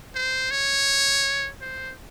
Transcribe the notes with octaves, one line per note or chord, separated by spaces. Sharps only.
C5
C#5
C5